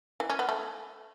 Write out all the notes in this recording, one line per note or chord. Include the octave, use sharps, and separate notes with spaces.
E3
C#4
B3
A3